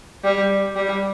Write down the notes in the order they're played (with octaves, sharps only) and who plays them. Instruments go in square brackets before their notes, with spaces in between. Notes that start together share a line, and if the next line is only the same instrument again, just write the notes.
[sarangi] G3
G3